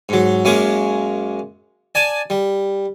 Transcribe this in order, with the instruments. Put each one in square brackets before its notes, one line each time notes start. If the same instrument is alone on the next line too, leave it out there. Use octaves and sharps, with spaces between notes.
[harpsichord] G#2 F#3
F#2 G#3 A#3 C#4 C#6 D6
D5 G#5 A5
G3